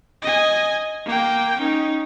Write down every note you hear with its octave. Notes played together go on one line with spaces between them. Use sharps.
D#5 G#5
A#3 G5
C#4 D#4